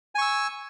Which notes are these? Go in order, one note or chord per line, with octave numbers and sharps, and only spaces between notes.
G#5 C#6 E6